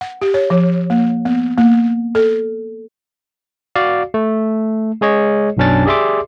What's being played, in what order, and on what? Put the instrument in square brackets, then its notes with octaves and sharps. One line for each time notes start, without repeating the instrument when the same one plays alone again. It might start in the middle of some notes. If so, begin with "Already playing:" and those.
[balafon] F#5
G4
C#5
F3
A#3
B3
A#3
A4
[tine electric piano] F#4 D5 F5
A3
G#3 G#4 C#5 D#5
B1 F#2 B2 C#4 D4 A6
G4 G#4 D5 E5 C6 D6